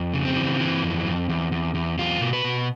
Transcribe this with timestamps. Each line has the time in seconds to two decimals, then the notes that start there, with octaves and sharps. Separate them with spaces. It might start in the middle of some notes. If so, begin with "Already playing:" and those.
Already playing: F2
0.14 C#3
0.25 C4
0.37 E3
0.60 E3
0.83 F2
1.06 F2
1.29 E2
1.52 E2
1.75 E2
1.99 E2 F4
2.21 B2
2.33 B4
2.45 B2